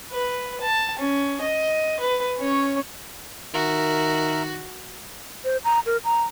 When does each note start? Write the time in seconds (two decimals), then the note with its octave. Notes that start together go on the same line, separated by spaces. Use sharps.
0.11 B4
0.61 A5
0.99 C#4
1.41 D#5
2.00 B4
2.39 C#4 C#5
3.54 D#3 F#4 A#4 E5
5.45 C5
5.65 A#5
5.86 A#4
6.04 A#5